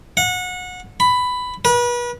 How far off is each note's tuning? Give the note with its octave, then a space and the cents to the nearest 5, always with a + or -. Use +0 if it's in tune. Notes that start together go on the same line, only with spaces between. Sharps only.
F#5 -25
B5 +10
B4 -35